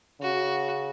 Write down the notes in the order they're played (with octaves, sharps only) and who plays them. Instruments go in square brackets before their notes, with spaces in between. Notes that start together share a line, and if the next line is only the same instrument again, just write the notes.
[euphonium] C#3 [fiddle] F#4